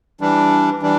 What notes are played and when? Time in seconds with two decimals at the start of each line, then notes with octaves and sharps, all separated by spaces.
0.21 E3 G3 D4
0.82 E3 G3 D4